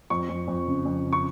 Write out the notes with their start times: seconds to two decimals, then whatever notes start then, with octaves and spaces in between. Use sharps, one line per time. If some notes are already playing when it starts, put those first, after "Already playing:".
0.10 F2 C#6
0.29 F2
0.48 F2
0.67 C#3
0.86 F2
1.06 C#3
1.13 C#6